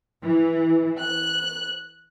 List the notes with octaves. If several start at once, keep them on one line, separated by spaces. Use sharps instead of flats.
E3
F#6